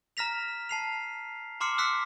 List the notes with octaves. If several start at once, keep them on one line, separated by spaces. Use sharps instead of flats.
A#5 F6 A#6 B6 F7
A5 C7 F7
A#5 C6 D6 F6 C7 C#7
E6 F#6 B6 C#7